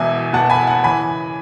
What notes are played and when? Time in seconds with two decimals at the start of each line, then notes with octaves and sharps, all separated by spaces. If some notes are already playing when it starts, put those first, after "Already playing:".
Already playing: E1 E2 B2 E5 G#5
0.33 E1 E2 B2 F#5 A5
0.50 G#5 B5
0.67 F#5 A5
0.84 C#3 E3 G#5 B5